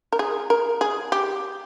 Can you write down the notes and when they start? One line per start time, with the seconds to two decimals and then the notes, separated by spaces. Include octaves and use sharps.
0.13 A#4
0.19 G#4
0.50 A#4
0.81 G#4
1.12 G4